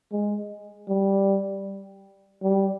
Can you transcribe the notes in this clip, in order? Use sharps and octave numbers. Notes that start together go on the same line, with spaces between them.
G#3
G3
G3